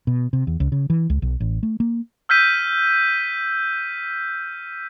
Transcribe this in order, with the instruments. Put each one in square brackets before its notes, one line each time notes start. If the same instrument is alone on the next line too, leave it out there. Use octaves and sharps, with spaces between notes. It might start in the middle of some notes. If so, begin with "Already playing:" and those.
[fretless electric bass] B2
C3
E2
C#2
C#3
E3
C#2
B1
A1
A3
A#3
[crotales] E6 F6 G6 B6 D#7